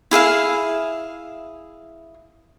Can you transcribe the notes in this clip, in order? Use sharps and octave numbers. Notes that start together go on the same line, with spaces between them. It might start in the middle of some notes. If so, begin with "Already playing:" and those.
E4 G#4 E5 F5